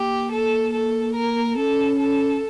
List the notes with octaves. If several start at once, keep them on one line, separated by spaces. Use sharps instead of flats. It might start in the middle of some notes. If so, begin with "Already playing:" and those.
Already playing: A#3 G4
A4
A4
A#4
C#4 A4
A4